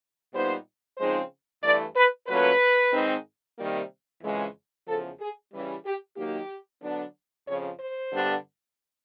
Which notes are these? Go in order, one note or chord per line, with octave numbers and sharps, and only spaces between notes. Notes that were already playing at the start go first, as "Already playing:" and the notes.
A#2 G3 B3 D#4 C5
C#3 F3 G#3 C4 D#4 C5
G2 E3 A3 D5
B4
A#2 F#3 A3 C#4 B4
G#2 D#3 G#3 C4 D#4
C3 D#3 G3 A#3
F2 C#3 E3 G#3
E2 C#3 F3 A4
G#4
C#3 E3 G3
G4
D#3 F#3 A#3 D#4 G4
D3 F#3 B3 D4
F2 C#3 F3 C#5
C5
G2 D3 G3 B3 D4